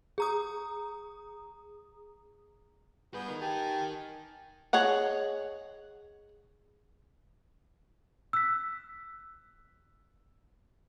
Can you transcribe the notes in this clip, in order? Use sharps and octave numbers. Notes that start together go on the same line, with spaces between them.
G#4 A#5 D#6
G3 B3 G#4 B4 G6
D#4 A#4
G4 G#5 A5
G#4 C#5 D#5 F#5
E6 F#6 B6